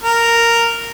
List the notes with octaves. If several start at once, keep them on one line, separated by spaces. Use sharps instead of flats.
A#4